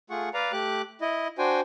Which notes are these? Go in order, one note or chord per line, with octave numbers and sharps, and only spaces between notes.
A3 F4 G#4 F#5 C#6
B4 D5 F5 A#5
A3 G4 D6 F#6
E4 D#5
D4 F#4 C5 G5 G#5